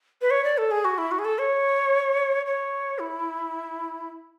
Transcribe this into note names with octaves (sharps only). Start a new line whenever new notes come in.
B4
C#5
D5
A4
G#4
F#4
E4
F#4
G#4
A4
C#5
C#5
E4